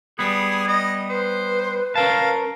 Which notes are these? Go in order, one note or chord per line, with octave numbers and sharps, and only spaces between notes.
G3 B3 G#4
D#5
B4 C5
C#4 A#4 F5 A5